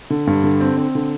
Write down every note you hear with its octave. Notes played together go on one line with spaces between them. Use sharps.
D3
G2
D3
C4
C4
D3